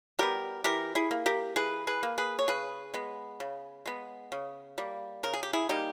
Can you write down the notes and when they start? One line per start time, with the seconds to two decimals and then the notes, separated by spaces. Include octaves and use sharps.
0.19 G3 B3 G4 A#4
0.64 E3 G4 A#4
0.95 E4 G#4
1.11 A#3
1.26 G4 A#4
1.56 E3 G#4 B4
1.87 G#4 B4
2.03 A#3
2.18 G#4 B4
2.39 C#5
2.48 C#3 G#4 B4
2.94 G#3 B3
3.40 C#3
3.86 G#3 B3
4.32 C#3
4.78 G3 A#3
5.23 C#3 A#4
5.33 G#4
5.43 G4
5.53 E4 G#4
5.69 G3 A#3 D#4 G4